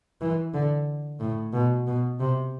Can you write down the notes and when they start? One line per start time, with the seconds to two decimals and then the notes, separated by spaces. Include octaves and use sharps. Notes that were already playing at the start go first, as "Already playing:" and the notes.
0.21 E3
0.54 D3
1.20 A2
1.53 B2
1.87 B2
2.20 C3